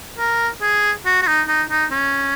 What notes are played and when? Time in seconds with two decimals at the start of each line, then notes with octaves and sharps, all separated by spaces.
0.18 A#4
0.61 G#4
1.05 F#4
1.22 F#4
1.27 D#4
1.48 D#4
1.70 D#4
1.91 C#4